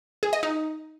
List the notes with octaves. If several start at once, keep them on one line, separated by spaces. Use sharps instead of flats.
G#4
D#5
D#4